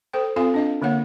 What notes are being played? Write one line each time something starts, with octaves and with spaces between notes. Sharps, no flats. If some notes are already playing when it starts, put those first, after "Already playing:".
A4 C5 G5
C4 F4 A4 F5 G#5
D4 D#5 F5
D3 A#3 C#5 F#5